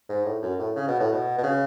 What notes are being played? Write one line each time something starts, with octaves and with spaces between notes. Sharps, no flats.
G#2
A2
F#2
A2
C#3
B2
A2
B2
B2
C#3